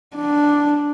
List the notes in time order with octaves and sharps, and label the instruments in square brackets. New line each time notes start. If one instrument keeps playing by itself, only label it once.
[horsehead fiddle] D4